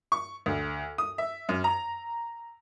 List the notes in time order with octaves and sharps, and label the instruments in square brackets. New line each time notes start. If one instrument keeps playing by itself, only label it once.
[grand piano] C#6
D2
D#6
E5
F#2
A#5